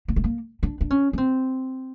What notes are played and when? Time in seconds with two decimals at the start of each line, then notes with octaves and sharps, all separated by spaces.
0.08 A#3
0.16 A3
0.24 A#3
0.63 D4
0.81 D4
0.90 C#4
1.13 C#4
1.18 C4